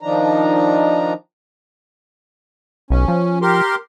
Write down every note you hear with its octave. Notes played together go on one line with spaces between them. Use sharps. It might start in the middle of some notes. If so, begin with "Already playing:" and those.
D#3 F3 D4 D#4 A#5
B1 C#4
F3
G4 A#4 C6